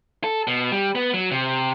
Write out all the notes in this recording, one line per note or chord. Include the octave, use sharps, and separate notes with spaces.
A4
B2
G3
B3
F#3
C3